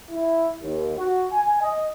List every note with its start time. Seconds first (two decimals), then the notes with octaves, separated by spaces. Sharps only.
0.11 E4
0.62 D#2
0.97 F#4
1.32 G#5
1.61 D#5